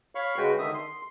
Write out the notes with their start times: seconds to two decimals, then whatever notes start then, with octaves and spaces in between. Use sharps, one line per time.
0.15 C#5 F5 B5 C#6
0.37 C#3 G#3 F#4 B4 G5
0.59 D3 D#3 E5 D#6
0.74 C6